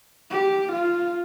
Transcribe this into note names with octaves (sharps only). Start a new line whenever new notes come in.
G4
F4